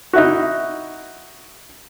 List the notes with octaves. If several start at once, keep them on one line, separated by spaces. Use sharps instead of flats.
D#4 E4 F#4